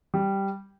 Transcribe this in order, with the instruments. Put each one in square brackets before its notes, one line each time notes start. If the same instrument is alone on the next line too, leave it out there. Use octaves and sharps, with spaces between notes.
[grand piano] G3